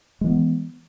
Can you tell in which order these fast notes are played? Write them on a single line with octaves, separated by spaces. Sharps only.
G#3 E3 B3